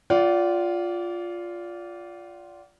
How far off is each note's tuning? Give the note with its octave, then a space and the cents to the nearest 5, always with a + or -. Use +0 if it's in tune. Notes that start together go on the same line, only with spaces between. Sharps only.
F4 +0 D5 -25 F#5 +35